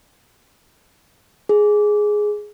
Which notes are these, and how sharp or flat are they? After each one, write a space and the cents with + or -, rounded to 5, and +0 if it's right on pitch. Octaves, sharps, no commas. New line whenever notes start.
G#4 +5